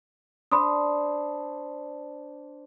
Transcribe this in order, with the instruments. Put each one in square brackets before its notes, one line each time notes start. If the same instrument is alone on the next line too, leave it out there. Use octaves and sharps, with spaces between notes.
[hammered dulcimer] D4 C5 [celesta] B5 C6 D#6